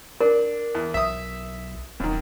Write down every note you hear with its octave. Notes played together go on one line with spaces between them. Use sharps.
D4 A#4
E2
B1 E5 D#6
D#1 F#2 D#3